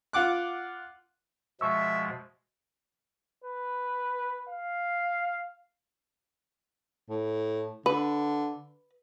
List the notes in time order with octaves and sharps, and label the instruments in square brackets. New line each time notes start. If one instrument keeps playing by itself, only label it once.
[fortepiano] F4 F#5 D6 F#6
[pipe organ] B2 F3 G#3 [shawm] E5 [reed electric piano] C#6 E6
[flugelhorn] B4
F5
[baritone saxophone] A2
[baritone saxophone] D3 [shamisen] B4